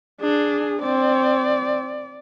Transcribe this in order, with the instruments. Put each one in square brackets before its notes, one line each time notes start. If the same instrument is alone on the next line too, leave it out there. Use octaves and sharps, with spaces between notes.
[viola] D4 [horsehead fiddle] G#4
[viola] C4 [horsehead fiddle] D5